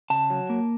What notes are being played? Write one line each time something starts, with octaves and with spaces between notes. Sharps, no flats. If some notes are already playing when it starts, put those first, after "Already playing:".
C#3 A5
F#3
A#3